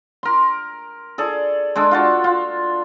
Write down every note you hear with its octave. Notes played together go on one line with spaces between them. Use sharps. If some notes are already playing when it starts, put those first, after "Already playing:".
A#4 C6
G#4 A4 D5
G#3 D4 A4
F4 F#4 A5
F4